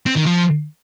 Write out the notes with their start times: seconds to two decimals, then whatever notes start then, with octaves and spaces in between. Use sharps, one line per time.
0.06 C4
0.16 D#3
0.26 F3